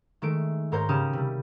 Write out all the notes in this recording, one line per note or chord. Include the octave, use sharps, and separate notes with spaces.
D#3 G#3 A3 D7
G#2 A#4 C5 C#5 G6
C#3 C#4 G4 D#6 E7
C3 G3